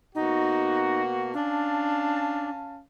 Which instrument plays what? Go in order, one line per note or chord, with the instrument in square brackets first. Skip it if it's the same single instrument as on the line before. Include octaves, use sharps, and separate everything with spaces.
[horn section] B2 A#3 F#4 [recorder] D#4
[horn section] C#4 F5 A5 [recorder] D4